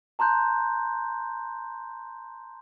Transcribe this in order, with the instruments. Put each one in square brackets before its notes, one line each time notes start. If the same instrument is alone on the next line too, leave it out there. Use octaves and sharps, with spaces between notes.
[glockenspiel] A5 A#5 C6 F#6 G6